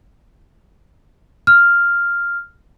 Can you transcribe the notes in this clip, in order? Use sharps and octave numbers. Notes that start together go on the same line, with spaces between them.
F6